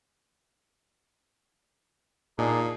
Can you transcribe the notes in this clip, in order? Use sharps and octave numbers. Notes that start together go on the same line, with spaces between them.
A#2 D4 D#4 G#4